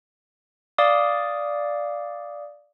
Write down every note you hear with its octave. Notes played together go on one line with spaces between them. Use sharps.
D5 F5 D6 D#6